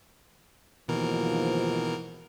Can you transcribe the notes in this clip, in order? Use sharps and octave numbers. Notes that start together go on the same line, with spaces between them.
D#2 G#2 B2 E3 F3 A#4